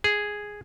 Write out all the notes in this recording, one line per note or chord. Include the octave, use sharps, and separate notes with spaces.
G#4